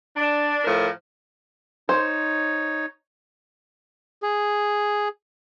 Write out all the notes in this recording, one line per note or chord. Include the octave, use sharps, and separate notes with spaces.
D4
A2 F3 A#4
D#4 C5 C#5
G#4